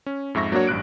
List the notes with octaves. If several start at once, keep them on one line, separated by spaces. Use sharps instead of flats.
C#4
F2 G#2 E5 C#6 A#6
F#3 A#3 D4 F#4 C#5
A1 G2 F#6 D7